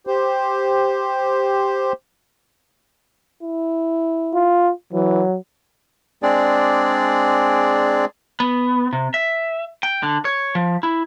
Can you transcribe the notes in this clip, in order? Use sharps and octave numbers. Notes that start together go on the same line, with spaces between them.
G4 C5
E4
F4
E3 F#3
G#3 C4 D4 G#4 D5
B3
C3
E5
G5
D3
C#5
F3
E4